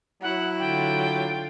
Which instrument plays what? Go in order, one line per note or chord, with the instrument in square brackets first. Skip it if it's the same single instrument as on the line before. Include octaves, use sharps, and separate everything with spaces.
[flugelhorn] F#3 [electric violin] E4 [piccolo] F#5
[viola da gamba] D3 D4 F4 [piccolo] G5